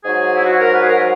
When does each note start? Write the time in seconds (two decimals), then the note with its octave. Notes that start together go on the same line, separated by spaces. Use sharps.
0.04 G#2 F#3 G#4
0.34 E4
0.45 F#4
0.59 A#4
0.73 B4
0.80 G#4
0.87 A#4